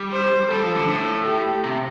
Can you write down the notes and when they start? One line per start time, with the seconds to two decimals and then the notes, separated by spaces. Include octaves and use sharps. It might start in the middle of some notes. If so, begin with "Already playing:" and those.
Already playing: G3
0.13 C5
0.51 G3 A4
0.63 F3
0.76 D3
0.88 A2
1.26 G4
1.64 C3